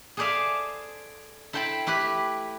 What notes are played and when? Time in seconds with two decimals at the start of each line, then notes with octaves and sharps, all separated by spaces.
0.17 G#4 A4 C5 D5 E5 F5
1.53 E4 A4 C5 G5 A5 B5
1.86 A3 E4 G4 B4 B5